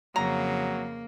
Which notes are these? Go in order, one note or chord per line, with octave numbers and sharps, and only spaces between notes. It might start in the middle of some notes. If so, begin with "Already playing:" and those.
F2 C#3 F#3 A#3 A#5